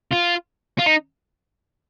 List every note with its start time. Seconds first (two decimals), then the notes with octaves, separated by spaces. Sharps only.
0.11 F4
0.79 F4
0.87 D#4